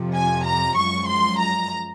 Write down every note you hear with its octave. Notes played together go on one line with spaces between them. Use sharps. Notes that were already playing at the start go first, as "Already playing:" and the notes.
Already playing: F2 C3 F3
G#5
A#5
F#2 F3 G#3 C#6
C6
A#5